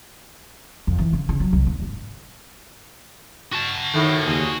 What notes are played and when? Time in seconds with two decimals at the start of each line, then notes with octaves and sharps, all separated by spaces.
0.87 F2
0.99 E3
1.13 C#3
1.29 C#3
1.40 F#3
1.53 C2
1.67 D#2
1.82 G#2
3.52 F#4 A5
3.94 A2 D#3
4.26 D#2 A#2 G#4